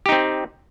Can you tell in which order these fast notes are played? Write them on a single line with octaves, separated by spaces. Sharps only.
G4 D#4 C4